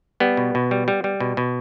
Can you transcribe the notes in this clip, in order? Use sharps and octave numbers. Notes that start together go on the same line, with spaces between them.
G3 B3
B2
B2
G3
G3
G3
B2
B2